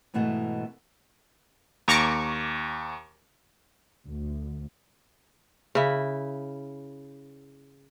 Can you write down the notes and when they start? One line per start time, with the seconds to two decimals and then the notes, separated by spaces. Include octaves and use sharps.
0.14 G#2 B2 E3 A3 B3
1.88 D#2 A#5 C#6 D6
4.08 D2
5.75 C#3 E4